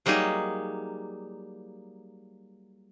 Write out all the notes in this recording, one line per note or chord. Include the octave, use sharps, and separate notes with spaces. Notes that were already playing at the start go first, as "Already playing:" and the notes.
F#3 G3 A#3 D#4 G#4